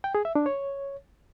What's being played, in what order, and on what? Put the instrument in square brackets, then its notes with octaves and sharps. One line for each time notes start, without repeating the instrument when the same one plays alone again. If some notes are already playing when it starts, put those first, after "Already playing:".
[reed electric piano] G5
G#4
E5
D4
C#5